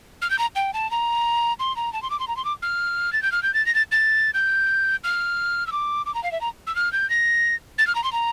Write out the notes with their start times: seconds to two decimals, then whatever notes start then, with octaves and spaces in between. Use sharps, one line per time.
0.22 F6
0.30 G6
0.39 A#5
0.56 G5
0.74 A5
0.91 A#5
1.59 C6
1.76 A#5
1.93 A5
2.02 C6
2.10 D6
2.20 C6
2.28 A#5
2.37 C6
2.45 D6
2.62 F6
3.13 A6
3.22 G6
3.32 F6
3.43 G6
3.54 A6
3.66 A#6
3.75 A6
3.92 A6
4.34 G6
5.04 F6
5.67 E6
5.72 D6
6.06 D6
6.15 A#5
6.23 F5
6.32 E5
6.41 A#5
6.67 E6
6.76 F6
6.93 G6
7.10 A#6
7.78 A6
7.87 F6
7.95 A#5
8.04 C6
8.12 A#5